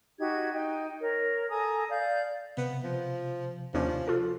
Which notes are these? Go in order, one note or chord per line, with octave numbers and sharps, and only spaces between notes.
D#4 F#4 G4 G#6
D#4 G5
A#4 C#5
A4 G#5 A#5 D#6
D5 F5 G6
C3 B3
F3
D#2 F3 C#4 D4
F4 A4